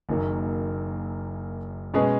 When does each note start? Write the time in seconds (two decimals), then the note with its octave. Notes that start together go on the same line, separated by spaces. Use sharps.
0.09 F#1 F#2 D#3 F#3 A#3
1.94 B2 G#3 C#4 G#4 B4